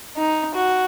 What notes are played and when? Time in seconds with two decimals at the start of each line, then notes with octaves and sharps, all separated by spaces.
0.17 D#4
0.54 F#4